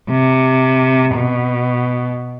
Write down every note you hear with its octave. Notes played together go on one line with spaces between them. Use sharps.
C3
B2